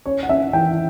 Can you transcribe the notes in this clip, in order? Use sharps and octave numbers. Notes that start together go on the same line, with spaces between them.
C#4 C#5
F#5
C#4 E5
E3 G5